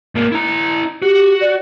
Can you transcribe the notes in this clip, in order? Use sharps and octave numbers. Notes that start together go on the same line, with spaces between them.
G#2 A#3
E4 A#5
F#4 G4
D5